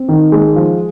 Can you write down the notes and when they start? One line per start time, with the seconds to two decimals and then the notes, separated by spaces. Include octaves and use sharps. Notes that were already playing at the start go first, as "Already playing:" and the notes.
Already playing: C4
0.08 D#3
0.32 G#3
0.56 F3